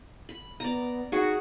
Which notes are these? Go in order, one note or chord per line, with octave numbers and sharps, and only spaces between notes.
B5
B3 D5 A#5
D#4 F#4 G#4